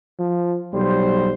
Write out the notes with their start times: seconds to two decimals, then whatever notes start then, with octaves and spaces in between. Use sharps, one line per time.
0.19 F3
0.73 B1 G3 C5